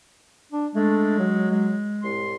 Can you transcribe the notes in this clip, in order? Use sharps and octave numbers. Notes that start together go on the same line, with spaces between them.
D4
G#3 A3 D4
F#3
G#3
C2 A2 C6